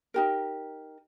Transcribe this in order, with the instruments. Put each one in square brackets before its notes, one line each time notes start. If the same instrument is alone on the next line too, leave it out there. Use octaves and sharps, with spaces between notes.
[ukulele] D#4 G4 A#4